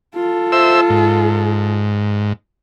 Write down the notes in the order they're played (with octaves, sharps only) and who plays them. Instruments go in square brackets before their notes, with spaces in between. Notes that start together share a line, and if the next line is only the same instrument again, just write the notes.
[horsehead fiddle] F4 A4
[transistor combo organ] C5 E5 E6
G#2